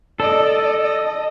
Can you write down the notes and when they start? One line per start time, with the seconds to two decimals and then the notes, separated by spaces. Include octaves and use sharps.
0.20 A4 D5 D#5
0.82 D#5